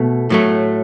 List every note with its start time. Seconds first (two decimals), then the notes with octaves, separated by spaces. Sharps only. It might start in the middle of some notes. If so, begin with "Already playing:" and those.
Already playing: B2 A3
0.30 A2 F#3 A3